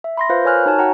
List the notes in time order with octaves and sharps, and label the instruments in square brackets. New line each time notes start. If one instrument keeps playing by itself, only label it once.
[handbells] E5
B5 C6 A#6
F4 B4 C5 F5 B5
A#4 C#5 G#5 F6 F#6
D#4 F#4 C#5 G#5 A5
F#4 F#5 G5 A#5